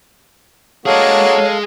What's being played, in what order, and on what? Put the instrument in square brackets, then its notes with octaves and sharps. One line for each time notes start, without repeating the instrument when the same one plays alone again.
[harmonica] A#3 D4 F#4 [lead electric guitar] G#4 D#5 [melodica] A4 F5 [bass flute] C#5